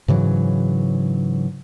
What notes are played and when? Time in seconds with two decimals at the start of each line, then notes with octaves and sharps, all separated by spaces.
0.08 G#2 C#3 E3 F#3